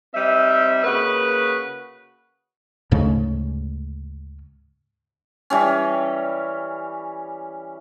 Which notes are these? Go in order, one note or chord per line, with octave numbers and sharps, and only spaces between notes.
G3 C4 D#4 E5
C#3 A#3 F#4 B4
D2 G#2 C#3 A3
E3 G3 C#4